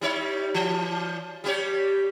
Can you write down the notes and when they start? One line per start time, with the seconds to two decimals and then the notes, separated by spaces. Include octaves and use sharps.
0.01 G3 D#4 C#5
0.54 E3
1.44 G3 G4 C#5